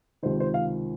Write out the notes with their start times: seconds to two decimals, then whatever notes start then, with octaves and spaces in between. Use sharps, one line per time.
0.23 C#2 C3 D#3 C5
0.40 C5
0.54 F5